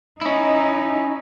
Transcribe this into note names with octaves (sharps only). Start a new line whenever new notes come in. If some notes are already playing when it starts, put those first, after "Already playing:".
C#4 D#4 E4